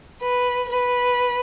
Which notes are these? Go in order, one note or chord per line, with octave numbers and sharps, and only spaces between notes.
B4
B4